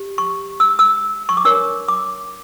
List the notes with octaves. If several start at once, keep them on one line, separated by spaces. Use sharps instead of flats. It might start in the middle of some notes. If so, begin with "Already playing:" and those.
Already playing: G4
C#6
E6
E6
C#6
D6
D4 A#4 C#5 E6
D6